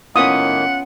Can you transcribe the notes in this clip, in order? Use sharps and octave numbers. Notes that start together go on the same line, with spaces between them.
A2 D#3 A#3 B3 C#4 F4 F#5 D#6